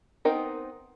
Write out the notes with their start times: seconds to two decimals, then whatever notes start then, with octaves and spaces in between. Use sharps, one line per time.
0.25 B3 C4 D#4 A#4